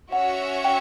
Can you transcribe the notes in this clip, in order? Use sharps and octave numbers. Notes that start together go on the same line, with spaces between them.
C#4 F#4 C#5 E5 F#5
G5